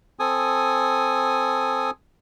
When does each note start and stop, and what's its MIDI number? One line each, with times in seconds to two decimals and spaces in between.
0.20 1.91 60
0.20 1.91 69
0.20 1.91 80
0.20 1.91 87